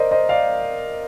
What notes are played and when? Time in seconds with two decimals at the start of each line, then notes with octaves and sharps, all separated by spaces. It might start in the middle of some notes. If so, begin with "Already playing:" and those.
Already playing: A#4 C5 D5 D#5
0.11 C5 D#5
0.29 D5 F5